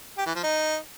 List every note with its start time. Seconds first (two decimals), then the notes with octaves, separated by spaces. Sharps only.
0.18 G4
0.26 E3
0.35 F3
0.44 D#4